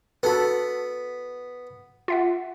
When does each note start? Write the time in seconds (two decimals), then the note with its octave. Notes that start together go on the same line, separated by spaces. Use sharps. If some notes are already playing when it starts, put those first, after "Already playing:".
0.23 B3 F#4 A4 B4 B5
2.08 F4 E5 F#5